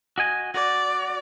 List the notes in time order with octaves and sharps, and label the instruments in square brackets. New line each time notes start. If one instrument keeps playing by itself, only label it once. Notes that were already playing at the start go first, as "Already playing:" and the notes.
[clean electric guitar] F#4 D#5 G#5
[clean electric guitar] F#4 [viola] D5